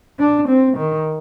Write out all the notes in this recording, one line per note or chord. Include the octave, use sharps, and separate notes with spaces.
D4
C4
D#3